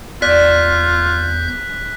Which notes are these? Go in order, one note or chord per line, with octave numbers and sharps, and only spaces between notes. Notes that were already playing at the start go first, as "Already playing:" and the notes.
E2 F4 D5 F#6 G6 B6